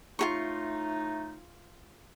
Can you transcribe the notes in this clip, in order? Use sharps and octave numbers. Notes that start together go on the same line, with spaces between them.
A2 A3 D#4 F4 G#4 C#6